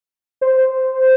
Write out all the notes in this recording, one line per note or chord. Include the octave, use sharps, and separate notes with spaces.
C5